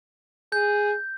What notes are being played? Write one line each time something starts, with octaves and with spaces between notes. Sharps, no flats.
G#4 G6